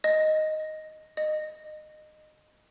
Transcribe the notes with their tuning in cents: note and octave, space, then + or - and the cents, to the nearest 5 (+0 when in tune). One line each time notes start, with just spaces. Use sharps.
D#5 +0
D#5 -20